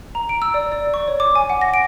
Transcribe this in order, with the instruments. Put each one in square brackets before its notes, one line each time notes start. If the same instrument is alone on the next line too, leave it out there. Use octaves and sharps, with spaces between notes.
[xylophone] A#5
D7
E6
D5
D5
C#6
C#5
D6
G#5
F#5
A#6
D7